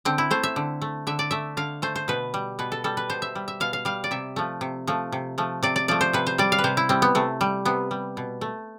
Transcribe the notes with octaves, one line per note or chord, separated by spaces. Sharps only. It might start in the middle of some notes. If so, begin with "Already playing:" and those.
D3 C4
E4
A3 C5
E5
D3
A3
D3 E5
D5
A3 E5
D3 F5
A3 C5
C5
B2 B4
G3
B2 B4
A4
G3 A4
B4
B2 C5
E5
G3
E5
B2 F5
F5
G3 F5
D5
C3 E5
F3 A3
C3
F3 A3
C3
F3 A3
C3 D5
D5
F3 A3 D5
C5
C3 B4
C5
G3 D5
F5
B4
C3 C5
E4
G3 C4
B3
C3 A3
G3
C3 B3
G3
B2
A3